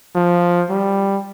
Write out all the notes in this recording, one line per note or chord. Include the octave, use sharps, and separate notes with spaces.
F3
G3